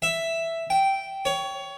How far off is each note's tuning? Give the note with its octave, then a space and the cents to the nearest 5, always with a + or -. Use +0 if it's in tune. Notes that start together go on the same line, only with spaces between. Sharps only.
E5 +5
G5 -10
C#5 +20